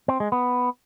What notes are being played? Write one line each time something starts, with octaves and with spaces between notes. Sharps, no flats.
C4
G#3
B3